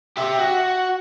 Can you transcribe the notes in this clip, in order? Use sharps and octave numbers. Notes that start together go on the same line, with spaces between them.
G4 E5
F#4